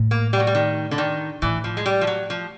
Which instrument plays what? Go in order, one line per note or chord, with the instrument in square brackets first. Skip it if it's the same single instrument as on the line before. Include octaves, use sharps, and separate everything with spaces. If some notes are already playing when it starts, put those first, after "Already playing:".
Already playing: [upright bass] A2
[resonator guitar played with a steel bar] A#3
G3
F#3
G3
D#3
D3
D#3
[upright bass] A2 [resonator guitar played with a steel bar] E3
[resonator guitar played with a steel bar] F3
G#3
G3
F3
F#3
F3